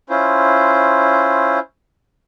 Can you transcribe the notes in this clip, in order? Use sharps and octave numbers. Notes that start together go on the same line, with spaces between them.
C#4 E4 F4 C5